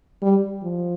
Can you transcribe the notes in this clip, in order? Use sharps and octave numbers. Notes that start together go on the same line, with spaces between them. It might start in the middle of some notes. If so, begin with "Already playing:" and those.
G3
F3